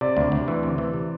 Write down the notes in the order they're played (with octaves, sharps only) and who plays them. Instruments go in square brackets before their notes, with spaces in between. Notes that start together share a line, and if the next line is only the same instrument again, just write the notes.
[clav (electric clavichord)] C3 [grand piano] D5
[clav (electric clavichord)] D2
D2
E3
C3
E3
C3